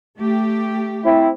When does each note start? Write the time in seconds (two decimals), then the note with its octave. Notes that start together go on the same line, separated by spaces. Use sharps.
0.19 A3 G4
1.04 C4 E4